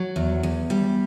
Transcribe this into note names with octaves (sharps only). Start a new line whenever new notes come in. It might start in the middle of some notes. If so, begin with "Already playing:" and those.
Already playing: F#3
E2
E2
G3